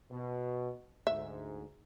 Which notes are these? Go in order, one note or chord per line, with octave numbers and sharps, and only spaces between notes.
B2
D2 G#2 E5